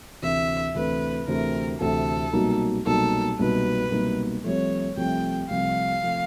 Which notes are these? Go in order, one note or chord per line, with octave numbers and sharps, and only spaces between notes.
D2 C3 E3 A3 C4 E5
D2 C3 E3 A3 C4 B4
D2 C3 E3 A3 C4 A#4
D2 C3 E3 A3 C4 A4
C2 B2 F#3 A#3 D#4
C2 B2 F#3 A#3 D#4 A4
C2 B2 F#3 A#3 D#4 B4
C2 B2 F#3 A#3 D#4
C2 C3 F3 A3 C#5
C2 C3 F3 A3 G5
C2 C3 F3 A3 F5
C3 F3 A3